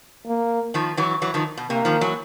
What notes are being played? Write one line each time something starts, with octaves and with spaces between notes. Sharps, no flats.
A#3
D#3 F3
E3 F#3
E3 F#3
D#3 F3
B2
C3 A#3
D#3 F3
E3 F#3